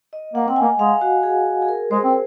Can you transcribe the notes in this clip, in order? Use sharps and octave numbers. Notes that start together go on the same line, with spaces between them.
D#5
A#3 F#5
C4 F#5
G#5
A#3
G#3 F5
F#4
G#4
G#4
A#4
G#3 C5
C4